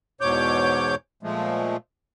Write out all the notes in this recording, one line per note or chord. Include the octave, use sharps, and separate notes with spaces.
E2 G#2 B2 C#5 D6 G6
A#2 F3 G#3 A3